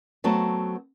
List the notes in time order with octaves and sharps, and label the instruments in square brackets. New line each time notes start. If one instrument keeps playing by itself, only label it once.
[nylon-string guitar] F#3 A3 B3 C4 A5